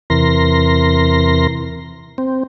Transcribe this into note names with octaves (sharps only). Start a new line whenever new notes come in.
E2 C3 E3 A#4 C6 A#6
C4